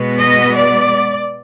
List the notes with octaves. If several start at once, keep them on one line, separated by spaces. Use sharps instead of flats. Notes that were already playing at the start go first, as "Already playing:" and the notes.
Already playing: B2 G#3 B3
D#5
D5